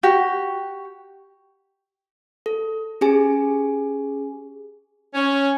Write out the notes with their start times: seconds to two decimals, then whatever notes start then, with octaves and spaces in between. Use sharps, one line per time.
0.03 F#4 G4
2.46 A4
3.01 C#4 G4 G#4 G#5
5.14 C#4